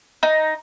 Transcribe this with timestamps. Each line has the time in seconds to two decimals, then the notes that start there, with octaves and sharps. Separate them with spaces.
0.23 D#4